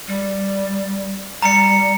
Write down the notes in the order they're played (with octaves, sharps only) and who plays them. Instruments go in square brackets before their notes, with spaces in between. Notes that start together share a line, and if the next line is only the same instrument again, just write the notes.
[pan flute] G3
[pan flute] G3 [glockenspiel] A#5 C#7